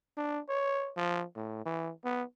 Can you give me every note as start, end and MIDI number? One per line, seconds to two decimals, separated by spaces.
0.18 0.40 62
0.49 0.91 73
0.97 1.25 53
1.36 1.61 45
1.65 1.92 52
2.05 2.23 59